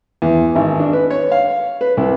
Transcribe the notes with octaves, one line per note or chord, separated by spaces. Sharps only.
E2
G#1
D4
B4
C#5
F5
B4
C2